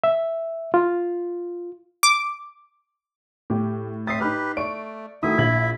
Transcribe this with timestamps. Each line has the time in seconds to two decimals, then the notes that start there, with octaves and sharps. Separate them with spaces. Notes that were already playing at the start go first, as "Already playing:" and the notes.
0.04 E5
0.74 F4
2.03 D6
3.50 A2 G4
4.07 C4 E5 D#6 A6 C7
4.20 D#4 G4 B4 B5 F6
4.57 A3 D5 C#6 D7
5.23 D#3 A3 E4 F#4 E5 D#6
5.38 A#1 G#6 F#7